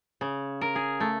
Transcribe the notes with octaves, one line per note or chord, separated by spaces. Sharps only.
C#3
A#4
G#4
A3